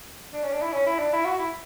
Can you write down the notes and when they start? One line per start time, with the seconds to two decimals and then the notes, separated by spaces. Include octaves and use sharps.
0.33 D4
0.43 C#4
0.52 D4
0.62 E4
0.72 C#4
0.86 E4
0.99 D4
1.13 E4
1.25 F#4
1.39 E4